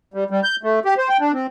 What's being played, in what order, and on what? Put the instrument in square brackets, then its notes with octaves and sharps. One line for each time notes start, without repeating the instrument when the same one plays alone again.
[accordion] G3
G3
G6
A3
G4
C5
G5
D4
C4